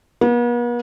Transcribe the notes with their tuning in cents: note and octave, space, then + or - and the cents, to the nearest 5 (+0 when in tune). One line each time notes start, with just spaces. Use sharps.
B3 -45